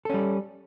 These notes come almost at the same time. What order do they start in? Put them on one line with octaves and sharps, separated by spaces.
A4 C#4 G3